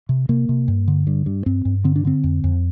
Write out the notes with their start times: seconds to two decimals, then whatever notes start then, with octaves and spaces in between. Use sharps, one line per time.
0.09 C3
0.29 C3 A#3
0.49 C3
0.68 G2
0.88 D3
1.07 G2
1.26 G2
1.46 G2 C4
1.65 G2
1.84 D3 C4
1.96 D4
2.05 D3 C4
2.24 F2
2.44 F2